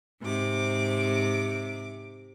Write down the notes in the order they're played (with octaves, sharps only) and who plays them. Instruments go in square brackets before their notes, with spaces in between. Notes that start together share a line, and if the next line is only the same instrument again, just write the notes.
[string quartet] G#2 C3 D6